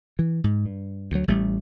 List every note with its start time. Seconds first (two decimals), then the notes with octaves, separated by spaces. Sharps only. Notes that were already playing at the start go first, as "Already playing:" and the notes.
0.19 E3
0.44 G#2
0.66 G2
1.12 D2 F#3
1.28 A1 G3 A3